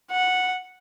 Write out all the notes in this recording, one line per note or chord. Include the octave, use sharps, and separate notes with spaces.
F#5